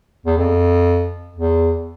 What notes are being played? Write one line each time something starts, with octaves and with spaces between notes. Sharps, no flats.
E2
F2
E2